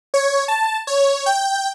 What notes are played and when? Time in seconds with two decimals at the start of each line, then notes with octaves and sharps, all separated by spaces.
0.14 C#5
0.48 A5
0.87 C#5
1.26 G5